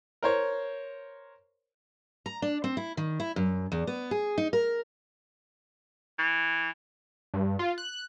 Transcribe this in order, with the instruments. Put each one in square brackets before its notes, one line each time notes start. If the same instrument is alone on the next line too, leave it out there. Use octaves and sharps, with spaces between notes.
[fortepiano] A#4 C5 C#5
[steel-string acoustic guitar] A#5
D4
C4
E4
D#3
E4
F#2
E2
B3
G#4
D#4
A#4
[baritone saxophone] E3
[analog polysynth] G2
F4
F#6